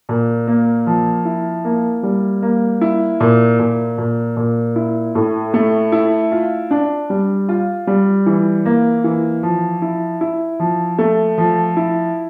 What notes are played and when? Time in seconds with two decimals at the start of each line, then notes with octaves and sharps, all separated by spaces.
0.09 A#2
0.47 A#3
0.87 F3
1.25 E4
1.65 A#3
2.03 G3
2.42 A#3
2.81 E4
3.20 A#2
3.59 A#2
3.98 A#2
4.37 A#2
4.76 E4
5.15 A2
5.54 A3
5.92 E4
6.32 F4
6.71 D4
7.10 G3
7.49 F4
7.87 G3
8.26 E3
8.65 A#3
9.04 E3
9.43 F3
9.82 E4
10.21 E4
10.60 F3
10.98 A3
11.38 F3
11.77 E4